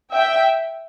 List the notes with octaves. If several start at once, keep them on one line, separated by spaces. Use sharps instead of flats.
E5 G5